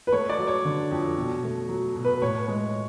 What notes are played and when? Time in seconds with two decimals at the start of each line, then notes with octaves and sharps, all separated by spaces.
0.07 B4
0.12 A3 C#5
0.29 D5
0.38 F#3
0.47 C#5
0.65 D3
0.91 F2
1.17 B2
1.43 A3
1.69 F#3
1.96 B2
2.05 B4
2.22 A2 C#5
2.48 G#3